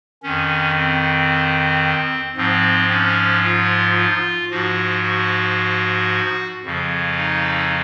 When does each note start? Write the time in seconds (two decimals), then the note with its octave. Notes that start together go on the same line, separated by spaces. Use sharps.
0.23 F2 D#3 C#4
0.77 C4
2.36 G#2 F3 C4
2.90 C#4
3.44 F4
3.97 F4
4.51 G#2 F3 F#4
5.03 F#4
6.64 F2 C#3 F3
7.17 D#4